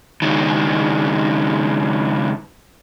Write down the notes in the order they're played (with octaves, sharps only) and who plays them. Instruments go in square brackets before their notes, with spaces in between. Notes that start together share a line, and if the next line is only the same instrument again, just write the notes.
[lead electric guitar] C#2 D#3